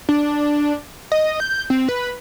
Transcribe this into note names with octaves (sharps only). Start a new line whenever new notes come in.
D4
D#5
G6
C4
B4